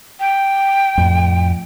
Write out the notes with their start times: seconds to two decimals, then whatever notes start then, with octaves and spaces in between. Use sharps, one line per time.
0.20 G5
0.97 F2 A2